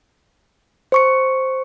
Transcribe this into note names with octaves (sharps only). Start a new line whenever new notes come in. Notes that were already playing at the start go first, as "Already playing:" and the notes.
C5 C#6 C#7